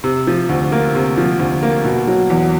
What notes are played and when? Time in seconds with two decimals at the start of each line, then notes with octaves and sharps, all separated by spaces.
0.04 C3
0.27 F3
0.49 D2
0.72 A#3
0.95 C3
1.17 F3
1.39 D2
1.63 A#3
1.84 B2
2.07 F#3
2.30 E2